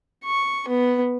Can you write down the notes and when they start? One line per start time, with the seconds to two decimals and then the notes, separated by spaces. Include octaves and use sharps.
0.25 C#6
0.68 B3